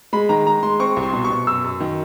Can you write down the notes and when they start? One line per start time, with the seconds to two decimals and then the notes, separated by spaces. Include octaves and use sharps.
0.13 G#3 B5
0.29 D#3 A#5
0.46 G#3 A#5
0.63 G#3 C6
0.80 C4 C#6
0.97 C2
1.03 C6
1.13 B2
1.25 C#6
1.30 B2
1.47 F#2 E6
1.64 F#2
1.80 D#3